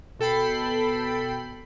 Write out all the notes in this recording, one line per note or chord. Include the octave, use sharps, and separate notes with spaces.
B2 A4 G5 B5 C7